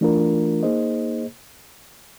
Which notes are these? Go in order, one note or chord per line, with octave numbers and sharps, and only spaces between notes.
E3 A3 D4 F4 A#4
A#3 D#4 G#4 C5 D#5